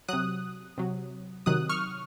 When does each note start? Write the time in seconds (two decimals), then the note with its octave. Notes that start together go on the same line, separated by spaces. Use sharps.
0.08 C3 F#3 D#6 F#6
0.78 C3 F#3
1.46 C3 D#3 F#3 D#6 F#6
1.69 C#6 F6